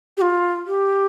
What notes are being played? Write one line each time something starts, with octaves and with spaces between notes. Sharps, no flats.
G4
F4
G4